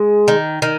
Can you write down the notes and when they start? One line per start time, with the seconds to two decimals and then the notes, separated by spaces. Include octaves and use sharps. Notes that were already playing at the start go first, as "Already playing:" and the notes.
Already playing: G#3
0.28 D#3
0.62 D#3